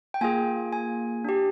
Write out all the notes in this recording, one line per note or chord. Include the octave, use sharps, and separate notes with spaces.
G5
A#3 F4 G#4 G#5
G#5
D4 G4